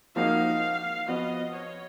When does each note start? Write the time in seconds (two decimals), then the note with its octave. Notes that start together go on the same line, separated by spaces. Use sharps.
0.16 F3 A#3 D#4 F#4 F5
1.08 F3 B3 F#4 D#5
1.55 C#5